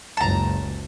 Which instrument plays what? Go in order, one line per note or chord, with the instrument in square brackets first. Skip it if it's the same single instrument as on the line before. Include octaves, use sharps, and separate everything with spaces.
[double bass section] F#1 C#2 [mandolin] A5 A#5